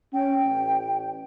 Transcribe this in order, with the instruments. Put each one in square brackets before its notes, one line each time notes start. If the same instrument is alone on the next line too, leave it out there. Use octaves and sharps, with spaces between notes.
[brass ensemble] C#4 [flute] G5
[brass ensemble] A1